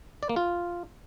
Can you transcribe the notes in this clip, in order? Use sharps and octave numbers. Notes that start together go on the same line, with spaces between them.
D5
A#3
F4